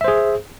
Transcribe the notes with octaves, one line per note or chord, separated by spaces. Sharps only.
G#4 C5 E5